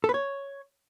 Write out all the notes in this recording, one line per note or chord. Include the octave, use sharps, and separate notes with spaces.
A4
B4
C#5